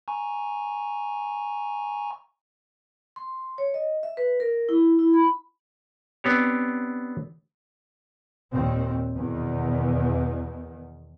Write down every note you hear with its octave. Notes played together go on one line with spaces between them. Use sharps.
G#5 A#5 C#6
C6
C#5
D#5
E5
B4
A#4
E4
E4
B5
B3 C4 D4 G4 C#5
D#2 A#2 D#3 C4
E2 B2 D#3